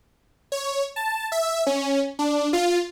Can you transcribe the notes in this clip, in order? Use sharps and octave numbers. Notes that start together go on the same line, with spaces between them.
C#5
A5
E5
C#4
D4
F4